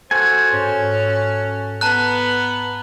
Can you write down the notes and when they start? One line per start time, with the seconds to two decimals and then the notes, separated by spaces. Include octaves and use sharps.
0.11 F#4 A4 C5 G#5
0.53 G#2 C#4
1.81 B3 A5 A#5 F#6